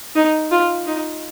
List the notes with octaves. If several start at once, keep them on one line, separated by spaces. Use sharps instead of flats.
D#4
F4
D#4